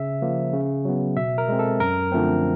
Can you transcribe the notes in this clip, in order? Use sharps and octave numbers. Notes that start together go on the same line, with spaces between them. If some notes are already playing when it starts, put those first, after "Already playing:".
Already playing: C#3 E5
F3 A#3
C#3
F#3 B3
B2 E5
A#4
G#3 C4
A4
F#2 A#4
D3 F3 A3 C4